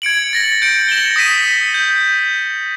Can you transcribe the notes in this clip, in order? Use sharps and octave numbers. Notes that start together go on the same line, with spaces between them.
G#6 C#7 D7 F#7
A6 A#6 F#7
G6 C#7 D7 F#7
A#6 E7 F#7 G7
D#6 A#6 B6 D#7
G6